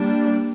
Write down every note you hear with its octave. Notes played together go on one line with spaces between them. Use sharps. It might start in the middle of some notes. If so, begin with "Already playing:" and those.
Already playing: G3 A#3 D4